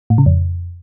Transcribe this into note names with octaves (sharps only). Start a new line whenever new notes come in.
A2
C#3
F2